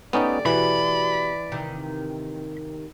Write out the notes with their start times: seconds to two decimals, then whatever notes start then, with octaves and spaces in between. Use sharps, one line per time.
0.13 A3 B3 C#4 D#4 G4 D5
0.46 B2 E3 F#4 G4 B5
1.52 D#2 C3 D#3